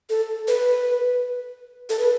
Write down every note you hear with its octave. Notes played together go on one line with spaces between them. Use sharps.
A4
B4
A4
B4